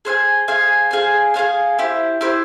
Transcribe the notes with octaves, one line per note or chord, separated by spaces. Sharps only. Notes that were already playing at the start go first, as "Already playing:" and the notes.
G#4 C5 F5 G#5
G#4 C5 F5 G#5
G#4 C5 F5 G#5
G#4 C5 F5 G#5
E4 G4 C5
E4 G4 C5